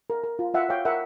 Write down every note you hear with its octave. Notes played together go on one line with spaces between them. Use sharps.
A#4
A#4
F4
F4 E5 F#5
C#5 F5 G5
A#4 E5 F#5